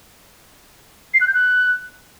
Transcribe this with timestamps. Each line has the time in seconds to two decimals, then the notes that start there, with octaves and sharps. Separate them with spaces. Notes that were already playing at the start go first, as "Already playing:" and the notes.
1.14 C7
1.21 F#6
1.27 G6
1.34 F#6